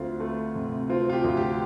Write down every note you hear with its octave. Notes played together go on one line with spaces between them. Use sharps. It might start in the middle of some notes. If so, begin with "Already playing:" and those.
Already playing: D2 C4 F4
A3
C3
C4 F4
F4
G4
D2
G4